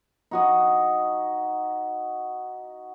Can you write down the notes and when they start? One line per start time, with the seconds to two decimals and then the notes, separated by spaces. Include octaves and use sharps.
0.31 D#4 F#4 D#5